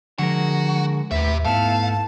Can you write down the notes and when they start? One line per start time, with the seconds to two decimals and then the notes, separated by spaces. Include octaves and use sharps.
0.19 D3 F3 G#3 F#4 A#4
1.11 D#2 A2 G4 B4 E5
1.45 G#2 A3 B3 E4 F5 A5